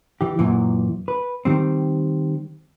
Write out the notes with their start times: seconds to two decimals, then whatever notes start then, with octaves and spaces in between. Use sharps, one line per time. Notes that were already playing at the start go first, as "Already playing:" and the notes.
0.21 E3 G4
0.39 F#2 A#2 E3
1.08 B4
1.45 D#3 G3 C4